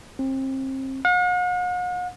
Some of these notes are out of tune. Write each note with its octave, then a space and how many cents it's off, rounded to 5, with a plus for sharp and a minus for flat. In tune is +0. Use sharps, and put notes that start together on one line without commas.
C4 +30
F#5 -45